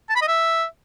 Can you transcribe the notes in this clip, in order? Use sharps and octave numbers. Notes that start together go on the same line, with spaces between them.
A5
B5
D#5
E5